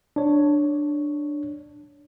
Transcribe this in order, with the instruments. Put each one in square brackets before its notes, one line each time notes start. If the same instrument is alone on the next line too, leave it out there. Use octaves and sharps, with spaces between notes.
[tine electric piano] D4 C#5